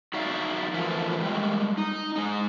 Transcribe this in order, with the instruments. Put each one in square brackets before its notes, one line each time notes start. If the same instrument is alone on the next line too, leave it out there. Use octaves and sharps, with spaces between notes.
[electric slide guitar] F#3 D#4 F#4 D5 E5 F5
E3 F3 A3 F4 A#4 E5
G3 G#3 A#3
D#4
G#3 D#4